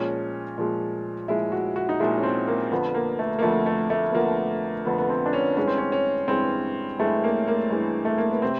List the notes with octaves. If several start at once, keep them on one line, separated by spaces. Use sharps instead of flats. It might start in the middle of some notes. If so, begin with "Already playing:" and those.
Already playing: A#2 F3 G#3 C#4
A#2 F3 G#3
A#2 F3 G#3 E4
F#4
F#4
D#4
A#2 F3 G#3 E4
C#4
C4
A#3
F2 D3 F3 B3
A#3
A3
A#3
F2 D3 F3 A3
A3
A3
B3
F2 D3 F3 A#3
F2 D3 F3 B3
B3
C4
D4
C#4
G2 E3 G#3 C#4
C4
C#4
C#4
G2 E3 G#3 C4
G2 E3 G#3 A3
A#3
A#3
G2 E3 G#3
A3
A#3
B3
C3 C4